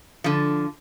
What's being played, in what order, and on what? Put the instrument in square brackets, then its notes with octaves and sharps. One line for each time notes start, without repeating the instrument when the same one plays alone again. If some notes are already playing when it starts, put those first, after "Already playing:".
[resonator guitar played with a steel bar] D3 F3